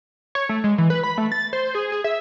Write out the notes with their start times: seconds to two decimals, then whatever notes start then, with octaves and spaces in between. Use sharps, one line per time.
0.35 C#5
0.49 A3
0.64 G#3
0.78 E3
0.90 B4
1.03 B5
1.18 A3
1.32 A6
1.53 C5
1.75 G#4
1.92 G#4
2.04 E5